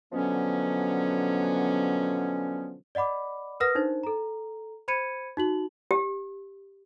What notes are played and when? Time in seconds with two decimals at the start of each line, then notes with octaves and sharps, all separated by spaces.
0.12 B2 D3 F3 F#3 B3 C#4
2.95 D5 D#5 F#5 B5 D6
3.60 A#4 B4 F#5 D#6 F6 A#6
3.75 D4 D#4 A#4 C5
4.03 A4 A#5
4.88 C5 B5 G#6 C#7 D#7
5.37 D#4 F#4 F#7
5.91 G4